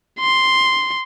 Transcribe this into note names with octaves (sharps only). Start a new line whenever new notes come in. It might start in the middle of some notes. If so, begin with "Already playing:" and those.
C6